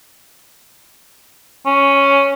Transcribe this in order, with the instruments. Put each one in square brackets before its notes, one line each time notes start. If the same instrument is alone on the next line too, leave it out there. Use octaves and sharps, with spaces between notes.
[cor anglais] C#4